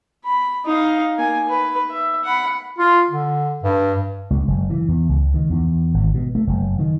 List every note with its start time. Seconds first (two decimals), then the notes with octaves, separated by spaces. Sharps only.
0.25 B5
0.66 D#4 F5
1.18 A#3 G#5
1.49 B4
1.91 E5
2.24 F#5 B5
2.79 F4
3.10 D3
3.63 G2
4.30 C#2
4.48 F#1
4.70 E3
4.88 E2
5.09 C#2
5.34 D#3
5.50 E2
5.94 G#1
6.14 B2
6.35 A3
6.47 F#1
6.79 D#3